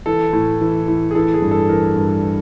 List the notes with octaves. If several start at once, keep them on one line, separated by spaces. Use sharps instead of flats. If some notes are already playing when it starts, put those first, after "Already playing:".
E3 A4
A2
E3
A2
G#4
E3 A4
G#4
G2
A4
E3 A#4
G2